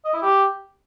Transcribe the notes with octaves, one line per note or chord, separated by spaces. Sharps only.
D#5
E4
G4